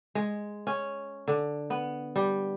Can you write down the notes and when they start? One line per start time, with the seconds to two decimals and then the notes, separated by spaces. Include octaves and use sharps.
0.15 G#3
0.67 C#4
1.28 D3
1.70 B3
2.16 G3